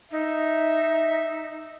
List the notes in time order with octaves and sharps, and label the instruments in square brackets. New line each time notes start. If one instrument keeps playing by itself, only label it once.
[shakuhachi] D#4 [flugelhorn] E5